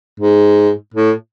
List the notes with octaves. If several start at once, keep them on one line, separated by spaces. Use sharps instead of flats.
G#2
A2